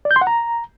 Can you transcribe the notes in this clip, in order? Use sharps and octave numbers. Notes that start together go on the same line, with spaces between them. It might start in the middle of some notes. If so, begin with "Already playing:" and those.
D5
G6
C6
F#5
A#5